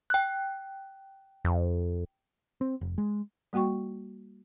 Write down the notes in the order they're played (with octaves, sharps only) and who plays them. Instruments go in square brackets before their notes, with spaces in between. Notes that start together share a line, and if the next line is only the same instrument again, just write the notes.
[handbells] G5 F#6
[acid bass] F2
[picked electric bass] C4
F1
G#3
[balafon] G3 A#3 F#4 G5 C#6